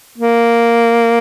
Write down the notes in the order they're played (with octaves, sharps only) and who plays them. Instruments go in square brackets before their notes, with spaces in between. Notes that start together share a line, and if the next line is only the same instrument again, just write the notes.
[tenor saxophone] A#3